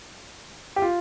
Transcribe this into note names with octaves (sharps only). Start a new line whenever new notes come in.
G4
F4